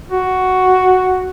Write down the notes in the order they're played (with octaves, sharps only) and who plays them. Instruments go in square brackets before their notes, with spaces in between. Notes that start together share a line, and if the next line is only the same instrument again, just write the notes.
[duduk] F#4